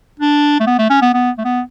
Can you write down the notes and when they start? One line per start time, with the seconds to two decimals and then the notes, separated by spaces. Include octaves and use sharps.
0.20 D4
0.60 A3
0.67 B3
0.79 A3
0.90 C#4
1.02 B3
1.14 B3
1.38 A3
1.45 B3